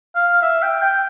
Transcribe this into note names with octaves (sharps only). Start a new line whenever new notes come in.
F5
E5
G5
G5